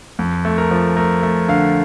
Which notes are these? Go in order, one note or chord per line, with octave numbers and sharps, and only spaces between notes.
F2
A3
A#4
F3
A3 A#4
A3
D3 F5